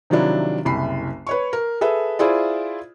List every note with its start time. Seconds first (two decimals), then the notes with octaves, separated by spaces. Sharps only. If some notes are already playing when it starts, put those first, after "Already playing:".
0.10 C3 D#3 F3 F#3 D4 E4
0.65 F#1 C2 B5 C7
1.27 B4 C#5 C#6
1.53 A#4
1.81 G#4 A4 B4 E5
2.19 E4 F4 G#4 C5 D5 E5